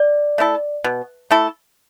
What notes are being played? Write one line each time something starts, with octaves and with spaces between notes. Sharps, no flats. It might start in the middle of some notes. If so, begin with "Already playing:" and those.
Already playing: D5
A3 E4 A4
B2
A3 E4 A4